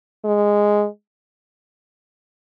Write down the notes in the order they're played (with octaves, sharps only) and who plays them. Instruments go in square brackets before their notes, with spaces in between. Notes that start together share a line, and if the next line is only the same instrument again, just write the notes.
[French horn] G#3